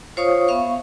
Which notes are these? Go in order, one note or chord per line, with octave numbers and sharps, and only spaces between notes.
F4 C5 C#5 F5 C#6 D#6
B3 E5 F5 C#6